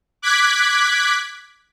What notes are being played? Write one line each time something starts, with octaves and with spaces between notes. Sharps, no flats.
D6 F#6 G#6 B6